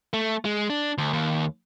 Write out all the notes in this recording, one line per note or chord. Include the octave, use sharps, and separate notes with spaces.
A3
G#3
D4
D2
D#2